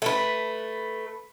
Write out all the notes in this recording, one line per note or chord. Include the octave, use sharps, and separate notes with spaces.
A3 B4